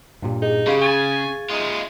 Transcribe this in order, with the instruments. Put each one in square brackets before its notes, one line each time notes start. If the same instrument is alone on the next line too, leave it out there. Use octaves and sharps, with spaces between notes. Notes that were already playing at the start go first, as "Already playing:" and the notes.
[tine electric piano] G2 A#2 G4
[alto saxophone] D#4 [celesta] G#4
[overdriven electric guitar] C#3 [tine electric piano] G4 B5 C6 [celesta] G#4 F5
[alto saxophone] G#5 [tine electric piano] C#6 G#6 A6
[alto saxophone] G#3 [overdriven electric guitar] D#4 F4